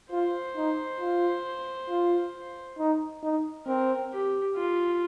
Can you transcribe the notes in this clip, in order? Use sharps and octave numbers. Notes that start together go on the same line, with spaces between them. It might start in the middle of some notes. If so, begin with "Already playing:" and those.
F4 C5
D#4
F4
F4
D#4
D#4
C4 A#4
G4
F4